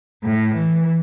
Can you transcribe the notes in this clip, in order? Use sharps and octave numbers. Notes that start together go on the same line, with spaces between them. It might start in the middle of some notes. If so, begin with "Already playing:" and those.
A2
E3